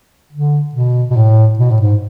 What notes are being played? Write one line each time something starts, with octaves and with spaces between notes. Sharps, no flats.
D3
B2
B2
A2
B2
A2
G#2